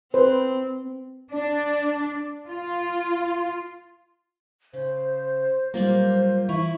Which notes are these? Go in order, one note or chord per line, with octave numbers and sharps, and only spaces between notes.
C4 B4 C5
D4
F4
C#3 C5
A#2 F#3 G3 A#3 F4 C5
E3 E4 C#6